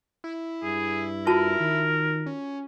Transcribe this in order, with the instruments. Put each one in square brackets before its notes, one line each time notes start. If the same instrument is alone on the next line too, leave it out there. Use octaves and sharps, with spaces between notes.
[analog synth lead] E4
[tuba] G2 [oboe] G#4
[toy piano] F4 F#4 A5 [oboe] A#4
[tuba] D#3
[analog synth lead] C#4